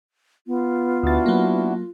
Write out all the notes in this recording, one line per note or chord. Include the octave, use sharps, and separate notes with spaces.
B3 F4
D2 D4 E4 F#4 A6
F#3 A#3